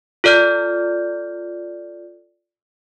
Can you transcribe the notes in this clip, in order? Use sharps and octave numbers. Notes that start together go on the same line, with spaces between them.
F4 A4 D5 F6 G6